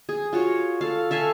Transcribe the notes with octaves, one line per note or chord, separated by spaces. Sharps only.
G#4
F4 F#4 C#5
A4 F5
A4 E5 F5 G#5